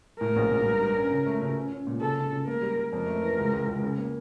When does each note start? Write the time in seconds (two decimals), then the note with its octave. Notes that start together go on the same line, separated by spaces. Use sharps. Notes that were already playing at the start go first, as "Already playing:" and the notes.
0.20 A2 A#4
0.36 A#1
0.51 A#1
0.65 G2
0.81 G2
0.96 C#4
1.11 C#3
1.26 A3
1.42 C#3
1.57 C#4
1.72 C#4
1.87 A#2
2.01 C#3 A4
2.17 C#3
2.33 C#3
2.47 A#3 A#4
2.62 G3
2.78 G3
2.92 F2 A#4
3.07 A3
3.22 E3
3.38 C#2
3.53 C#2
3.68 C#2
3.83 C#3
3.98 A#3